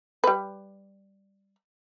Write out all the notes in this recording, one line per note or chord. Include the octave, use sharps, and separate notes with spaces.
G3 B4